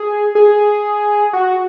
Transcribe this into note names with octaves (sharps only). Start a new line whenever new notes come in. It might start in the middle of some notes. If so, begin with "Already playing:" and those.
Already playing: G#4
G#4
F#4